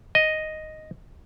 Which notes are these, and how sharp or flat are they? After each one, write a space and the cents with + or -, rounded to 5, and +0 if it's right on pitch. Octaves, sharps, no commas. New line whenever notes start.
D#5 +0